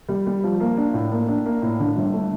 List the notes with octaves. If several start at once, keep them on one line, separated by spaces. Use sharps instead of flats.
G3
G3
F3
A#3
D4
A2
A#3
D4
A#3
A2
D3
G1
A3